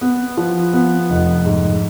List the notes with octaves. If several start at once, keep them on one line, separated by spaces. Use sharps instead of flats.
B3
F3
B3
F1
G#2